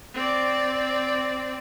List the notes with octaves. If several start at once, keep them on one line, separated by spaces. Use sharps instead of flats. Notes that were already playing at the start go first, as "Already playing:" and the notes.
C4 D5